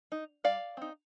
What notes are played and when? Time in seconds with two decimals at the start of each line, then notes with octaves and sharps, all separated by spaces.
0.12 D#4
0.44 G3 D5 F5
0.77 C4 D#4